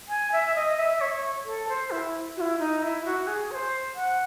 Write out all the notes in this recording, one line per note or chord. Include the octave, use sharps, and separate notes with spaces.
G#5
E5
D#5
E5
C#5
A4
C5
E4
F#4
E4
D#4
E4
F#4
G#4
C#5
C5
F#5